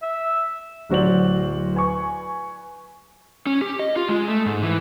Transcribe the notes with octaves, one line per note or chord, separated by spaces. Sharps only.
E5
D1 F#3 F#4 C5 D5 F#7
B4 G#5 C#6
C#4
G4
D#5
F4
G#3
A3
G#2
E3